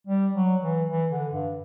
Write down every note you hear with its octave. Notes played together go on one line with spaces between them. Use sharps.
G3
F#3
E3
E3
D3
G2